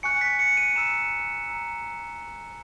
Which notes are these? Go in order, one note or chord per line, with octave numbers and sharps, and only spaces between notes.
G#5 C#6 F#6 C#7
B6
C#7
D#7
A#5 E6 E7
A#5 E6